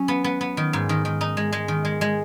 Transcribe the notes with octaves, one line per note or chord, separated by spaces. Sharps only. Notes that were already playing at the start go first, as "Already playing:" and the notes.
Already playing: F#3 C#4
B3
B3
B3
D#3
G#2
D#3
D#3
D#4
G#3
G#3
D#3
G#3
G#3